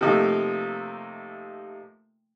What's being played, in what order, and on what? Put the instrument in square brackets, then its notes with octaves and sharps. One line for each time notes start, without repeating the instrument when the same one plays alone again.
[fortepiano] C3 F3 A3 A#3 D#4 F4